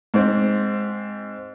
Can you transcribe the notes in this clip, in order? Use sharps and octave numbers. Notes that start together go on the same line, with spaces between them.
G#2 C4